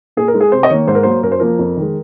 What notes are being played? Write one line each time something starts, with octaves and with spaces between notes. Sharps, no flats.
A#2 G#4
A#4
G#3
G#4
C3 C5
D#5
D#3 A#3 C#5
G#2 C5
A#4
F#3 A#3 C5
F#2 A#4
C5
F3 A#3 A#4
F2
D#3 G#3